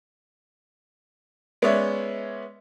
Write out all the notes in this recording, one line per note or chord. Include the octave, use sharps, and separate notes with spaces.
G#3 B3 C#4 C#5 D5 E5